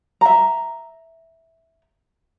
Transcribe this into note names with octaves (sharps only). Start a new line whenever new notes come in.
E5 A#5